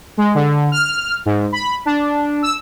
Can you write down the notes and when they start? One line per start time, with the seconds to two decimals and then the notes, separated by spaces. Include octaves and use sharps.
0.18 G#3
0.35 D3
0.72 F6
1.26 G#2
1.52 B5
1.86 D4
2.42 E6